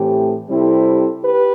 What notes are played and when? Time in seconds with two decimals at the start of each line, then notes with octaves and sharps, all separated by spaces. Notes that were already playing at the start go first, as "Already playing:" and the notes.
Already playing: A2 E3 A3 C4 G4
0.49 C3 G3 C4 E4 A4
1.24 G4 B4